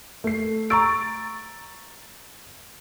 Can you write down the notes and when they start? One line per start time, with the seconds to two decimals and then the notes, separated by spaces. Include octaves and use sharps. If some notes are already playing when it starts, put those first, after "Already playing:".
0.24 A3 C7
0.70 A#5 C#6 E6 A6 D7